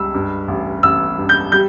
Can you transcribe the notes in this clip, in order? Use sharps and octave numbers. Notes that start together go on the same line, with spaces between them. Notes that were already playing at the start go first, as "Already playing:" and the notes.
Already playing: C#2 G3 E6
G2
A1
A1 E6
G2
G6
G3 G6